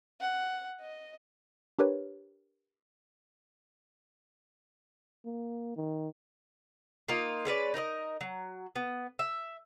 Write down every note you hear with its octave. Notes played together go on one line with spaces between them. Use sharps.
F#5
D#5
D4 G4 A#4 B4 C#5
A#3
D#3
A#3 D#4 F4
G#3 C#4 B4 D5
D#4 A#4 B4 D#5
F#3
B3
E5